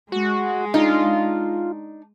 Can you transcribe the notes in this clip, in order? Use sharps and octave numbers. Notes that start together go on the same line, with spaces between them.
G#3 F#4
D4 D#4 F4